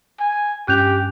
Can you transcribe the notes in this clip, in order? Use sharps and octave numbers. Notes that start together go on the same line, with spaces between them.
G#5
G2 C#4 G4 G#5 F#6 G6 F7